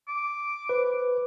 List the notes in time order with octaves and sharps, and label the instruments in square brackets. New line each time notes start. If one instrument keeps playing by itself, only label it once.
[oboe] D6
[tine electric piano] B4 C5